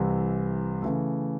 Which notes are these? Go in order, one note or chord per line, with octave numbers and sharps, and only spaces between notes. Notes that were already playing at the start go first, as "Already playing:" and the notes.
Already playing: C2 C3 E3
C#3 E3 A3